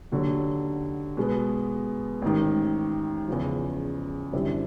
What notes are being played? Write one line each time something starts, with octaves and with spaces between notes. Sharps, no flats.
D#2 D3 F#3
B2 G#3 B3
A1 G#2 D#3
E2 C#3 F3
F#2 D3 G3 C4 E4